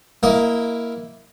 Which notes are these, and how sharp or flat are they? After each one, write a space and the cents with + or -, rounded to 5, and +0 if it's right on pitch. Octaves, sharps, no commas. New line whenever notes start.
A#3 +0 E4 +0 D#5 +25